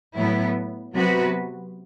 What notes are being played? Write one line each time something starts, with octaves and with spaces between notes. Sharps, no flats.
A2 F#3 B3 E4
C3 F#3 B3 F#4 B4